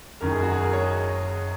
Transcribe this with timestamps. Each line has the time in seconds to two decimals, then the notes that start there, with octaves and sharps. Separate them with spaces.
0.21 F#1 F#2 D#3 A#4
0.32 G#4
0.42 F#4
0.52 G#4
0.62 A#4
0.73 C#5
0.84 D#5